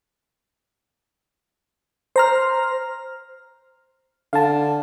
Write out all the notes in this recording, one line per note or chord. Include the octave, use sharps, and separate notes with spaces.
C5 A#5 F6
D3 F5 A5